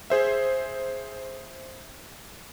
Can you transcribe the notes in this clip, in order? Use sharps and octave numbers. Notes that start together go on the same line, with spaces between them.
G#4 C5 E5